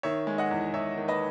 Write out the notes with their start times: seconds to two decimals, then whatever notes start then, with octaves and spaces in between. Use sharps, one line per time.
0.03 D#3 C#5 E5
0.27 G#3
0.38 D#5 F#5
0.51 E2
0.73 E2 C#5 E5
0.97 D#3
1.08 B4 D#5